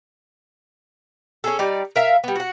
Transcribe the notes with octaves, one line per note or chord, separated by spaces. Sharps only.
C#4 G#4 A4
G3 D#4 D5
A#4 E5 F5
G3 B3
F#4 F#5